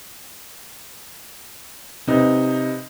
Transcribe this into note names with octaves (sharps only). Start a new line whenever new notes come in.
C3 D#4 B4